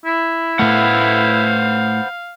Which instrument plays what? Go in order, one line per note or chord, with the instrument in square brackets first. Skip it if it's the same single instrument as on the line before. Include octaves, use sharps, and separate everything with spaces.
[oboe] E4
[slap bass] A2 A3 [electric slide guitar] B4 C5 F#5 [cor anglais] F5